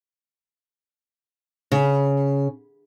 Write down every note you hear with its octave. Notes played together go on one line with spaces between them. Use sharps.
C#3